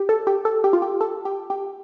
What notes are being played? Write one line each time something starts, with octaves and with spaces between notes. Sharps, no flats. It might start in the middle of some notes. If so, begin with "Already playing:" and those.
Already playing: G4
A4
G4
A4
G4
F4
G4
A4
G4
G4